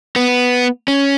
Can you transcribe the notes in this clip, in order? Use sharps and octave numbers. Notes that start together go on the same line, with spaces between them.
B3
C#4